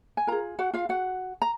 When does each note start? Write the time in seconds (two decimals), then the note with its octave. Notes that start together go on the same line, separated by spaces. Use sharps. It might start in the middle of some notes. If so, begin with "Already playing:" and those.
0.17 G#5
0.27 F4 G#4 A#4 A#5
0.59 F#4 F#5
0.74 F4 F5
0.89 F#4 F#5
1.42 A#5